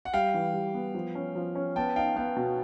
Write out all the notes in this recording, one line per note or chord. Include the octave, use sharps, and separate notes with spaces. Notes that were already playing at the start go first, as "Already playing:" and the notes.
F#5
G3 F5 G5
E3
G3
B3
F3
C#4
F3
C#4
B3 G5 A5
D#4 F5 G5
B3 F5 G5
B2